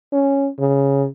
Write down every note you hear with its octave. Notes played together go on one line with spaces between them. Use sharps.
C#4
C#3